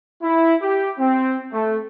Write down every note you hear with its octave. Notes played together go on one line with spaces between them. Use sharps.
E4
G4
C4
A3